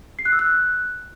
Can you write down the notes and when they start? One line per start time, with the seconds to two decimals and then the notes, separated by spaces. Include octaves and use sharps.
0.19 C7
0.25 F#6
0.32 E6
0.39 F#6